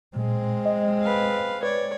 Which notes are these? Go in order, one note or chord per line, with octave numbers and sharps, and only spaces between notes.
A#2 G#3 C4
D#5
B4 F5
B4 C#5 D5